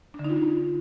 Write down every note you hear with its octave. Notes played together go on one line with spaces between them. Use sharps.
D4
D3
D#4
F4